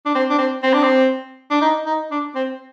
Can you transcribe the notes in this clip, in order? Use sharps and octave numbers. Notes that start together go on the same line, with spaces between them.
D4
C4
D4
C4
C4
D4
C4
D4
D#4
D#4
D4
C4